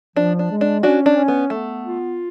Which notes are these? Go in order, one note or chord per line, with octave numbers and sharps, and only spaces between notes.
F3 D4
D4
G#3
D4
C#4 D4 F#4
D4
C#4
B3
A3 B3
F4